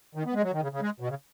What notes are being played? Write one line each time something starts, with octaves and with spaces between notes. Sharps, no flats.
D#3
B3
G#3
F#3
D#3
C#3
C#3
G#3
B2
C#3